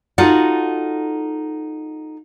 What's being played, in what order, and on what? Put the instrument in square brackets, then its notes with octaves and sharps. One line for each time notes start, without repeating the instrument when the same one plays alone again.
[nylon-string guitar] D#4 F4 F#4 A4 F#5